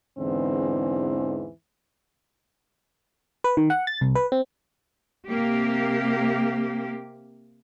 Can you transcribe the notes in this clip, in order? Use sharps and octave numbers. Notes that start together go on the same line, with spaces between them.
E2 G#2 D3 E3 C4
B4
D#3
F#5
A6
C2
B4
C4
C3 A#3 G4